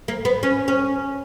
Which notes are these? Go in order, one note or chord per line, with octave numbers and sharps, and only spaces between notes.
A#3
B3
C#4
C#4